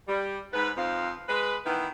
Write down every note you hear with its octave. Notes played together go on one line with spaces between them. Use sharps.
G3
G#2 B4
F2 C4 D#4 F5
G#3 B4
D#3 E3 B3 E4